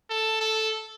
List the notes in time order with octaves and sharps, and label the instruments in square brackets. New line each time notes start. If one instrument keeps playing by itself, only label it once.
[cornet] A4
A4